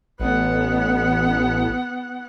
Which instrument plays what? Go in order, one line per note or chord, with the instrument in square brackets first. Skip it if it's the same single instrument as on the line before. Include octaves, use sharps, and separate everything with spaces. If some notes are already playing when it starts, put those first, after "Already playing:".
[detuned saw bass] A1 [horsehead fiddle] B3 F#5